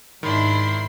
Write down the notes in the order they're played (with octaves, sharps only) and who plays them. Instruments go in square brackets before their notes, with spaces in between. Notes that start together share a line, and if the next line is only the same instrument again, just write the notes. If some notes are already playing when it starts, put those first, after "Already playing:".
[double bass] G#2 [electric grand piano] D#3 [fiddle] D4 E4 [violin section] B5 C6